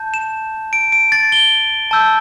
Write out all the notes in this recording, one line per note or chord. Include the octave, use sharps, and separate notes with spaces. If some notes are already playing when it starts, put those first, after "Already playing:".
Already playing: A5 G6
E7
D7
D7
A6
G7
A5 E6 G6